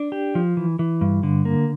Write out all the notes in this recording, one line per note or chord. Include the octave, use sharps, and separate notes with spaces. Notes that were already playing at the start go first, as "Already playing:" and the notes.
Already playing: D4
G4
F3
E3
E3
G2
D3
A#3